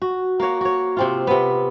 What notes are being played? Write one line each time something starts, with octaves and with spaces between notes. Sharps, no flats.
F#4
A#3 F#4 C#5 F#5
F#4 C#5
C3 C4 F4
C3 B3